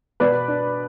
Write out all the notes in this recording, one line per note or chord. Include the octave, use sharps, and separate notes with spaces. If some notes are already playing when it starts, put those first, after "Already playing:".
B2 B4 D5
D4